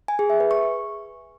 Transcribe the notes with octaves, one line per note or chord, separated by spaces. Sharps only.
G#5
G#4
E5
B4
C#6